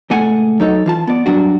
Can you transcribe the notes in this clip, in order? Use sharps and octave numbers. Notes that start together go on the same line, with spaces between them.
C#2 A#2 A3 F#5 G#5
F#3 D#4 A4 C#5
E3 F4 A5
B3 D5
G2 F#3 D4 F#4